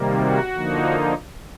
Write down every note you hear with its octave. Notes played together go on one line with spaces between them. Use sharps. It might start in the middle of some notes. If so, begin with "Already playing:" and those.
Already playing: C3 D#3 G3 A#3
F#4
D3 F3 A#3 D#4